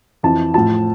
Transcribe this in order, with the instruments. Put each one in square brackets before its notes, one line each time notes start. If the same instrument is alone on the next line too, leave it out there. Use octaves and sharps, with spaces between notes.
[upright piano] F2 E3 A5
A2 F3 A5